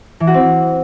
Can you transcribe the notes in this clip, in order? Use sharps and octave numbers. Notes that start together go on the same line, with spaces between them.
E3
F#4
C4